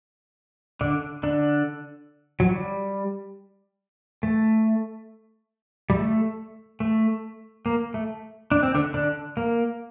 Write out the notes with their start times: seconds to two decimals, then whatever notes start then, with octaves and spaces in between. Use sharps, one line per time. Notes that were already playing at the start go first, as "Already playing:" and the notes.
0.81 D3 D4
1.23 D3 D4
2.40 F#3
2.52 G3
4.23 A3
5.90 G3
5.95 A3
6.80 A3
7.66 A#3
7.94 A3
8.52 D4
8.63 C4
8.74 D3 D4
8.94 D3 D4
9.37 A#3